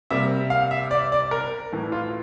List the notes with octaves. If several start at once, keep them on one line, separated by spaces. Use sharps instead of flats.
C3 G3 A#3 E5
F5
E5
D5
D5
A#4
A2 E3 A3
F4